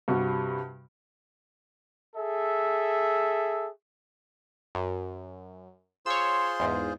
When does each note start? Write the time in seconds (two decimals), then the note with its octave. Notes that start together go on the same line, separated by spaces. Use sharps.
0.08 G2 C3 G3 F#4
2.15 G#4 A4 E5
4.75 F#2
6.06 F4 G#4 C5 C#5 C6 E6
6.60 E2 G#2